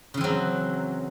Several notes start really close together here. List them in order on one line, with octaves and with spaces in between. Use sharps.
C#3 E3 C4 F#3